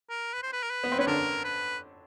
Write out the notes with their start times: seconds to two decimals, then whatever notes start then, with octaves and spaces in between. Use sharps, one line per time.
0.10 A#4
0.33 B4
0.43 C5
0.53 B4
0.63 A#4
0.70 B4
0.84 B3
0.92 C4
0.99 C#4 B4
1.07 D3 D4 A#4
1.44 B4